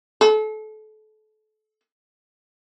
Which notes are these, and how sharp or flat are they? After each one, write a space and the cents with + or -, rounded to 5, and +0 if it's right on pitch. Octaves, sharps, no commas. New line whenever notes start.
A4 -30